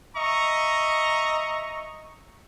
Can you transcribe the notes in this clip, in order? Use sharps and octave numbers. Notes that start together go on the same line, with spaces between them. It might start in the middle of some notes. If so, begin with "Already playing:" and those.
D#5 E5 A#5 C#6